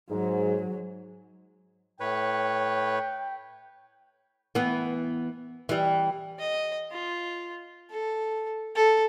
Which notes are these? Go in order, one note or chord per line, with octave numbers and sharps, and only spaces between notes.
G#2 F#3
A2 B4 C#5 G5
E3 B3
E3 G3
D#5
F4
A4
A4